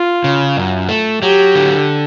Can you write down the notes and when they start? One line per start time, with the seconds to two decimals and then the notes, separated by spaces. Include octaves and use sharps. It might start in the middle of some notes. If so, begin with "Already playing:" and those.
Already playing: F4
0.24 C#3
0.57 F#2
0.89 A3
1.22 F#3 G4
1.55 D3